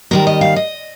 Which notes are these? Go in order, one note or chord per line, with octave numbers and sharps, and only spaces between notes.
D#2 D#3 G3 A#4
D#5
F5
D#5